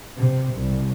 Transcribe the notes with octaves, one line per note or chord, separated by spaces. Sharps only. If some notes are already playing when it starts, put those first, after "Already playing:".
C3
C2